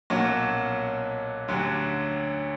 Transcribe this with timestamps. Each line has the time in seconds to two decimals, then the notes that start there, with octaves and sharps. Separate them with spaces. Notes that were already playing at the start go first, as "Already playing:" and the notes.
0.10 B1 A#2 F#3 C#4 F#4
1.48 D2 D3 F#3 C#4 G4